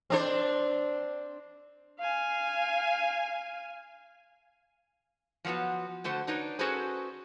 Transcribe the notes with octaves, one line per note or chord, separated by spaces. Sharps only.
C4 D4 C5
F5 G#5
F3 F#3 A#3 B3 F#4
D3 A3 F#4 C5
D4 D#4 B4 C#5
C#4 F#4 G#4 A4 B4 C5